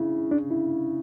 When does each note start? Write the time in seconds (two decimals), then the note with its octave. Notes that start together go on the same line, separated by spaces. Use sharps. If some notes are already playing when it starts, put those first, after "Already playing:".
Already playing: C#3 D4 E4
0.31 D4
0.51 E4